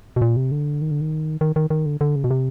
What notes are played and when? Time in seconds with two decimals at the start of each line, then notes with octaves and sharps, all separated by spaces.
0.16 B2
0.22 A#2
0.37 C3
0.52 D3
0.81 D#3
0.91 D3
1.01 D#3
1.41 D#3
1.56 D#3
1.70 D#3
1.86 D3
2.01 D3
2.16 C#3
2.24 B2
2.31 C3